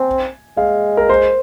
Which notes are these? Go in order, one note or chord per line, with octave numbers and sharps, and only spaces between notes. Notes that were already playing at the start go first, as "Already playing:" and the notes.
Already playing: C4 G#5
G#3 F5
A#4
C5